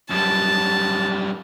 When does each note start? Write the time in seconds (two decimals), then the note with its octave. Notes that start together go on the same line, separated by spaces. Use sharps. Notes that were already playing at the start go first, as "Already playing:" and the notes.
0.10 F#2 G3 A5